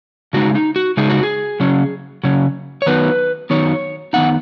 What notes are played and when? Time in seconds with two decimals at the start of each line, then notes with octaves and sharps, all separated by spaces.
0.33 C#3 G#3 D#4 F#4
0.55 D#4
0.76 F#4
0.97 C#3 G#3 D#4 G#4
1.10 F#4
1.23 G#4
1.60 C#3 F#3 C#4
2.24 C#3 F#3 C#4
2.82 C#5
2.86 D#3 F#3 B3 D#4 B4
3.50 D#3 F#3 B3 D#4 C#5
4.13 D#3 B3 D#4 F#5